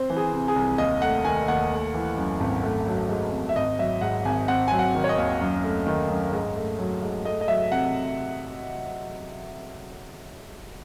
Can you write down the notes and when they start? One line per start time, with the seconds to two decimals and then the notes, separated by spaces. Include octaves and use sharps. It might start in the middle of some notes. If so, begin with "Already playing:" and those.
Already playing: C4 C5
0.10 E3
0.17 G#4
0.32 C3
0.48 G#4
0.56 C2
0.78 D#2 D#5
1.01 A3 F#5
1.25 D#3 G#5
1.48 D#2 F#5
1.71 A3
1.94 E3
2.17 F#2
2.40 G#1
2.64 A3
2.87 F#3
3.09 G#2
3.32 G#1
3.49 E5
3.56 G#1 D#5
3.79 F#3 E5
4.01 G#2 F#5
4.25 G#1 G#5
4.48 C4 F#5
4.68 F#3 G#5
4.79 F#5
4.95 D#3
5.04 C#5
5.09 D#5
5.17 D#2
5.41 F#2
5.64 A3
5.87 D#3
6.10 F#2
6.33 G#2
6.56 A3
6.79 F#3
7.02 G#2
7.25 A3 D#5
7.41 D#5
7.48 F#3 E5
7.71 C3 F#5